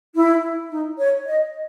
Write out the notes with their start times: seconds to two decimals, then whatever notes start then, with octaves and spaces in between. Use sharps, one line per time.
0.15 E4
0.70 D#4
0.98 C#5
1.26 D#5